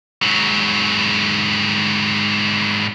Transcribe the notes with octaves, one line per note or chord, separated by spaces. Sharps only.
G#2 F#3